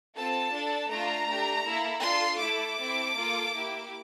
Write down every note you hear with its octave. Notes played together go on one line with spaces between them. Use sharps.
C4 F4 A4 A5
D4 A4
A3 D4 F4 A#5
A3 D4 G4
A#3 E4 A4
D4 F4 A4 C6
A3 E4 A4 D6
C4 E4 A4
A#3 F4 A4
A#3 E4 G4